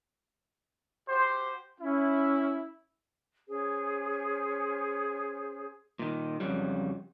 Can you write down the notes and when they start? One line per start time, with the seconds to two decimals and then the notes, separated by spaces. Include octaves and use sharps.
1.09 F#4 G4 C5
1.81 C#4 E4
3.48 C#4 G#4 C5
5.99 A#2 D#3
6.40 F2 G#2 C#3 F#3 G3